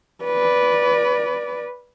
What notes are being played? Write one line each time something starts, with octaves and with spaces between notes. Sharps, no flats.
B4 D5